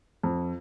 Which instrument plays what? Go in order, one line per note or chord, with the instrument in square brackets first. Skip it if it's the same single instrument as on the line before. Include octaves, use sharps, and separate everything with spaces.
[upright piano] F2